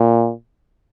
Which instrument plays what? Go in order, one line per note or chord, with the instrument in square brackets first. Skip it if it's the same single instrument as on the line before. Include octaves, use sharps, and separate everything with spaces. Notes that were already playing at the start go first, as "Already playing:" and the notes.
Already playing: [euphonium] A#2